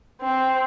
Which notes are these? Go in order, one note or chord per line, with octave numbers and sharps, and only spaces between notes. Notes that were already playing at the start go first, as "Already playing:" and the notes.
C4